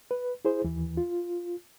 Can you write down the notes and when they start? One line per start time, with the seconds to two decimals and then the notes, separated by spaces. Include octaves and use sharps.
0.11 B4
0.45 E4 G#4 C5
0.65 D#2 E3
0.97 F4